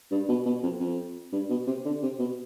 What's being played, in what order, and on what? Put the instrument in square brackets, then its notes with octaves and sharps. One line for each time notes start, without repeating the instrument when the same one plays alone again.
[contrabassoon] G2
B2
B2
F2
F2
G2
B2
C3
D3
C3
B2